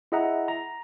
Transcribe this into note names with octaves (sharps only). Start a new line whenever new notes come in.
E4 G#4 D#5 E5 F#5 A#5
A#5